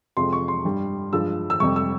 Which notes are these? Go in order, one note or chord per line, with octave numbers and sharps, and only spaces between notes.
F2 C3 F3 G#3 C6
C#6
C6
G2 G3
G2 F3 G#3 E6
E6
F2 C3 G3 C#6
E6